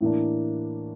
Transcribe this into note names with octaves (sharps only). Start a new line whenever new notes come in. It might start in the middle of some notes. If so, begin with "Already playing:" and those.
A2 E3 A#3 D4